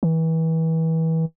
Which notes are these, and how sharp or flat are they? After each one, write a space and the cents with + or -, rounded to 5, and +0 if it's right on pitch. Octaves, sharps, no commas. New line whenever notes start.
E3 -30